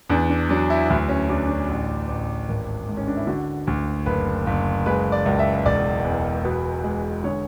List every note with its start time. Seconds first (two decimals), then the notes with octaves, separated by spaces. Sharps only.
0.09 E2 D4
0.30 D4
0.49 F#3 D4
0.70 E4
0.89 D2 E4
1.09 C#4
1.29 D2 D4
1.49 D4
1.69 A1
2.08 A1
2.49 G#1
2.88 G#2
2.97 C#4
3.07 D4
3.17 E4
3.27 D3 F#4
3.67 D2
4.06 F#1 B4
4.47 F#1
4.86 G#3 B4
5.12 D5
5.25 C#2
5.39 E5
5.65 E1 D5
6.04 E2
6.44 B2 B4
6.84 G#3
7.24 D3 C#5